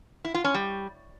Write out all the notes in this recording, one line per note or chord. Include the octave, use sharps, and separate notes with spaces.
E4
F4
C#4
G3